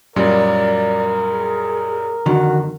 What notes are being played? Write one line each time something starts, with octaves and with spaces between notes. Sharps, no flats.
F#2 A#2 G3 A#4 D5
G#4
F2 D3 D#3 F#4